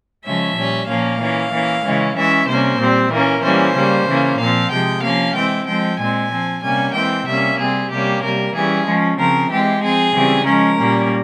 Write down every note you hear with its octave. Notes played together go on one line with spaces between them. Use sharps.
C#3 F3 G#3 C#4 E5
A#2 G3 C#4
A#2 F3 A#3 C#4 F5
E3 A#3 C#4
E3 A#3 C#4
C#3 E3 G#3 C#4
E3 G#3 C#4 E5
C3 G3 A#3 C#4 C5
A#2 G3 C4
E3 A#3 C#4 A#4
E3 G3 A#3 C#4 C5
C#3 G3 A#3 C#4
C#3 E3 A#3 C#4
A#2 F3 C4 F5
C3 F3 G#3 G5
F3 A#3 C#4 F5
E3 G#3 C4 G5
F3 G#3 C4 G5
A#2 G#3 C4 G#5
F3 C4
C3 G3 A#3 C#4 G#5
E3 G#3 C4 G5
C3 G3 A#3 C#4 E5
C3 G3 C4 G#4
C3 G3 A#3 C#4 G4
C3 G3 A#3 A#4
E3 G3 C#4 G#4
F3 G#3 C#4
C#3 F3 C4 A#4
E3 G#3 C4 G4
F3 C4 G#4
C#3 E3 G3 C4
F3 G#3 C#4 A#4
A#2 G3 A#3 C#4